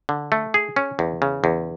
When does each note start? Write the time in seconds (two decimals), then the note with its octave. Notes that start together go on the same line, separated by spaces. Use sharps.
0.09 D3
0.32 A3
0.54 G#4
0.76 C#4
0.99 E2
1.22 C#3
1.44 E2